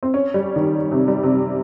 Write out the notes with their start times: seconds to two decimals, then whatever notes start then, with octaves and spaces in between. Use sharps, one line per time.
0.03 C4
0.14 C#4
0.34 G3
0.56 D#3
0.92 C3
1.08 G3
1.23 C3